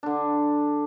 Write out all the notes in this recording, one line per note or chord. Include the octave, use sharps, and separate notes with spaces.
D3 D4